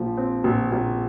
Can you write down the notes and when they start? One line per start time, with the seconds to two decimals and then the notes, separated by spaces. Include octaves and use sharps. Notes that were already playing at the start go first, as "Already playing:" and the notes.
Already playing: A#1 F3
0.17 C4
0.44 A#1
0.72 A#1